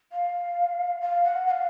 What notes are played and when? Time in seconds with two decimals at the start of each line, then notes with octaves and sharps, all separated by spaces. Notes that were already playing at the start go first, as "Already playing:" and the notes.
0.12 F5
1.01 F5
1.24 F#5
1.47 F#5
1.51 F5